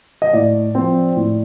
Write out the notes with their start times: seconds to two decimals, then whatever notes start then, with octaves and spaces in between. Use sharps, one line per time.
0.22 D#5
0.33 A2 D5
0.75 F3 C4
1.16 A2